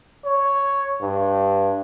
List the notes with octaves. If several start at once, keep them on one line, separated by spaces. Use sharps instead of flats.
C#5
G2